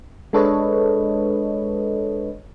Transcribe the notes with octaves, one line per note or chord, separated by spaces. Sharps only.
G#3 D4 A4 B4 C#5 D#5